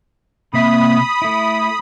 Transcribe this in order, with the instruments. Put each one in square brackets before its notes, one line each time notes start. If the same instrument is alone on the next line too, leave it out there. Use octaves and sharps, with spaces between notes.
[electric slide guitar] C3 A#3 E5 [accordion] B5 D#6
[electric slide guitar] A3 E4